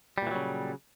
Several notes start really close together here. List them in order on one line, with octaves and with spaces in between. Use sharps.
G3 A#2 E3 F#3 C#3